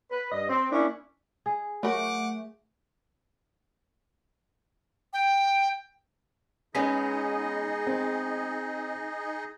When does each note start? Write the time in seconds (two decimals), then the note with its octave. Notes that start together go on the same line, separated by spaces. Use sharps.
0.11 B4
0.32 G2 D#5
0.49 C4
0.72 A#3 C#4 D4 E4
1.46 G#4
1.83 F#3 A3 A#4 F#5 D6
5.13 G5
6.75 G#3 B3 C#4 D#4 G#4 D#5 B6
7.87 C4